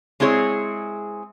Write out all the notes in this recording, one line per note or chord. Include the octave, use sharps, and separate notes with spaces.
G#3 C4 E4 G#4 C#5